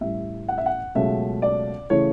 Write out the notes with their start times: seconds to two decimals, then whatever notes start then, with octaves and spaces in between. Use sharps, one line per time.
0.01 A1 A2 G3 E5
0.48 F#5
0.58 E5
0.66 F#5
0.95 C#2 B2 F#3 A3 E5
1.42 D5
1.90 C#3 E3 A3 C#5